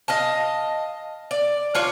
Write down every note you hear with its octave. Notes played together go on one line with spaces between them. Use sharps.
D#5 F5 A5
D5
D4 F4 C#5